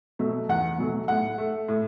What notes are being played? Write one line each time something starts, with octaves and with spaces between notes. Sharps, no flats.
B2 F#3 A3
E2 F#5
B2 F#3 A3
A2 F#5
A3
A2